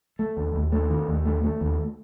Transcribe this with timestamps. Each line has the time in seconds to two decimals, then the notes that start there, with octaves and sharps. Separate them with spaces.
0.19 A3
0.37 D#2
0.55 D#2
0.72 A3
0.90 D#3
1.08 D#2
1.26 A3
1.44 A3
1.61 D#2